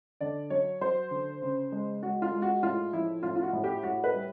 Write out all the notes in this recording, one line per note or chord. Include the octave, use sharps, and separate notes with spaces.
D3 D5
F#3 C#5
F#3 C5
D3
C#3
G#3
G#3 F#4
F4
G#3
F#4
A2 F4
F3 E4
A2 F4
F4
F#4
A2
G4
A2 F#4
B4
G3